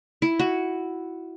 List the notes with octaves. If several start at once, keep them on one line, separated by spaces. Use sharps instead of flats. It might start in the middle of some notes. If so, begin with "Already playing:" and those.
E4
F#4